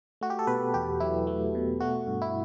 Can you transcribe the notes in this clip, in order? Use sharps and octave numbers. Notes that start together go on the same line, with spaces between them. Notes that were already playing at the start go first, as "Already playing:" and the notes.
A3 F#4
G4
A4
B2 B4
E2 G4
F#3 E4
A3
B2
A3 F#4
G2
E4